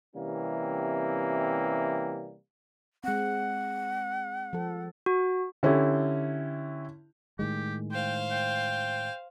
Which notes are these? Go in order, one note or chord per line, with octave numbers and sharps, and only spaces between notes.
C3 E3 G3 A#3 C4 C#4
G#3 C4 F#5
F3 A4
F#4
D3 C#4 E4 G4
A2 D#3 G#3 G4
C5 F5 G5
G5